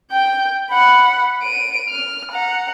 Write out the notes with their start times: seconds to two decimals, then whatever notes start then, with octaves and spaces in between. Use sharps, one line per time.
0.12 G5 G6
0.71 F#5 B5
1.43 D7 D#7
1.90 F6
2.31 F#5 A#5